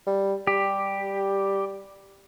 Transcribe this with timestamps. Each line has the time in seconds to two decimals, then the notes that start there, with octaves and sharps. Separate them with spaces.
0.07 G3
0.47 G3 G4